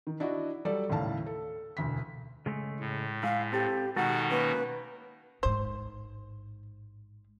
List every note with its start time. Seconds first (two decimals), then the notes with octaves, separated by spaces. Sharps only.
0.07 D#3
0.20 D4 E4 F#4 D#5
0.65 F#3 G3 A4 D5
0.89 D#2 A2 C#3 F5 A5
1.26 A4
1.77 E1 D2 B6
2.46 C#3 G#3 A3
2.80 A2
3.23 G#3 E4 F5
3.52 C4 G4 A4
3.96 B2 D#3 G#3 D#4 F#4 A4 F#5
4.31 A#3 C#4 B4
5.43 A1 G#2 C5